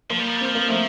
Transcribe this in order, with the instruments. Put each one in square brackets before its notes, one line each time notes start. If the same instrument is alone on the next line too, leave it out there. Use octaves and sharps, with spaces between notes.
[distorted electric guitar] F3 [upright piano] A#3
[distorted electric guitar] G3
F3
G3
[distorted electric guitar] F3 [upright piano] C4
[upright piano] A#3
[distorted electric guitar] F3 [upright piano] A3 C4